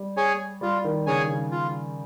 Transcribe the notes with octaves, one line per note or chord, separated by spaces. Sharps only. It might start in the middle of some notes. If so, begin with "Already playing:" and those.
Already playing: G3
G#4 C#5 G#5
G3 F4
D#3
C#3 G#4 C#5 G#5
C#3
F4